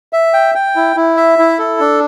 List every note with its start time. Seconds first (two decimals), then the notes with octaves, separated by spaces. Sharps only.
0.13 E5
0.34 G5
0.55 G5
0.76 E4
0.96 E4
1.17 E5
1.39 E4
1.59 A4
1.80 D4